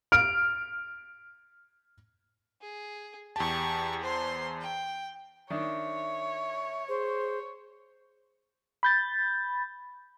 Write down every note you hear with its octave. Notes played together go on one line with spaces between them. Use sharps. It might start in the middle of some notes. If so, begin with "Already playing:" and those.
F6 D7
G#4
E2 G4 A5 C#6
C5 C6
G5
D#3 D4 C#5 E5
G#4 C5
B5 G6 A6